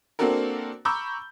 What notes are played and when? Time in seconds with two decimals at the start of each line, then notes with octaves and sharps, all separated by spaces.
0.19 A#3 C4 D4 F#4 A4 A#4
0.85 A#5 B5 C#6 D6 E6 G6